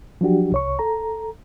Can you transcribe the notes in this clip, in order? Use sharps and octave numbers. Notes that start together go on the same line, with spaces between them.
F3 F#3 D4 F#4 G4
C2 C#5 C#6
A4 A#5